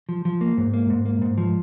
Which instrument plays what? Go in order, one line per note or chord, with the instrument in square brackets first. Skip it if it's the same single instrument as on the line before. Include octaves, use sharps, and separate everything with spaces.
[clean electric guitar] F3
F3
A#3
G#2
A#3
G#2
A#3
G#2
F3